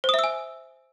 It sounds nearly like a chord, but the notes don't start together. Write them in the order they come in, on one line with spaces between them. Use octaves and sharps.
C5 D#6 E5 E6 G#5